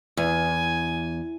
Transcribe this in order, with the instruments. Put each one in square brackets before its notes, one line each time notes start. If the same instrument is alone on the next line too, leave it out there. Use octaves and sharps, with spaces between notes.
[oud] E2 [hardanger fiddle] G#5